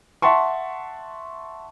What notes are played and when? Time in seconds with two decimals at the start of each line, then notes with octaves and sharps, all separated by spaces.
0.22 E5 F#5 A5 C6 C#6